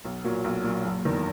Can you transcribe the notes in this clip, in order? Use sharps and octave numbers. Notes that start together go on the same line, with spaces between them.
B1
A#2 F#3
B1
A#2 F#3
F#1
E2 D#3